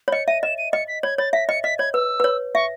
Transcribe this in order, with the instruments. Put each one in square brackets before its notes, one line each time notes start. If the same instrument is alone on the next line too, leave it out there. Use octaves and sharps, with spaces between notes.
[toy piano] C#5
[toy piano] D#5 [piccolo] C#7
[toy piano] E5 [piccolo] D#7
[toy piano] D#5 [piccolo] E7
[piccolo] D#7
[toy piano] D#5 [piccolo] C#7
[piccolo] B6
[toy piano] C#5 [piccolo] G#6
[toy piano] C#5 [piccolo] A6
[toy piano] E5 [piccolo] B6
[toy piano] D#5 [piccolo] C#7
[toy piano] D#5 [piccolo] B6
[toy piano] C#5 [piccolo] G#6
[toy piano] B4 [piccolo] E6
[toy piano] B4
C#5
[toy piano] E5 [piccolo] C#6